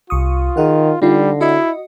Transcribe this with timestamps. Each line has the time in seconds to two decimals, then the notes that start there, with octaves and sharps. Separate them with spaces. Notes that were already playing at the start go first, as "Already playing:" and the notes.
0.10 C2 F4 C#6 D#6
0.57 D#3 G#4 A#4 F#5
1.02 D3 G3 D#4 F4
1.41 E4 F#4 D#5